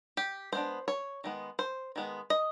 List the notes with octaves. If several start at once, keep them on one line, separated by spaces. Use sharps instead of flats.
G4
G#3 B3 D4 C5
C#5
D#3 G#3 B3
C5
D#3 G#3 B3
D#5